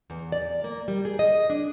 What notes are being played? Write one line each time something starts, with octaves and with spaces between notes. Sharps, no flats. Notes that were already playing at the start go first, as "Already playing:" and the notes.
E2
D5
A#3
G3
G#4
D#5
D4